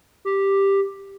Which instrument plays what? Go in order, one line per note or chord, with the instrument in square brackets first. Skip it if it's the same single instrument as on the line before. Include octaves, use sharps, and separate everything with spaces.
[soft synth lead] G4